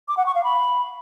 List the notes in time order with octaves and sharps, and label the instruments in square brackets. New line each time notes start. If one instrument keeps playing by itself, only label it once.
[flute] D6
F#5
C#6
F5
B5